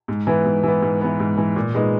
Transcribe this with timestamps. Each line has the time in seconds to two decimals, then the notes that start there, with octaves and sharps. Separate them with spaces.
0.08 G#2
0.27 E3 B3
0.45 G#2
0.63 E3 B3
0.82 G#2
1.01 E3 B3
1.20 G#2
1.37 E3 B3
1.56 A#2
1.74 G#3 B3 D#4